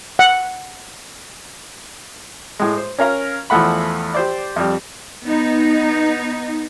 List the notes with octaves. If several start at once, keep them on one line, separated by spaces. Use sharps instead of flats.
F#5
A2 G#3
C5
C#4 A#4 F5 A#5
E2 E3 F3 A3 F#5 B5
G4 C5 D5
F2 G3
B3 D#4